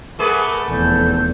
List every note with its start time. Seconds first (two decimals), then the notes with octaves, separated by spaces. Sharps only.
0.19 A3 G#4 A#4 B4 F#5 D6
0.69 F1 E2 A4 D5 G6